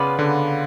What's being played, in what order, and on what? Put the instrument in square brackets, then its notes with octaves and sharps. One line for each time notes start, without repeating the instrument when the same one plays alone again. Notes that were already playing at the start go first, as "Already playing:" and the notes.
Already playing: [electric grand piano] C#3 [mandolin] B3 F4 B4 D5
[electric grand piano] D3